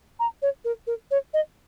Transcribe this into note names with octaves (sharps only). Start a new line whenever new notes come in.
A#5
C#5
A#4
A#4
C#5
D#5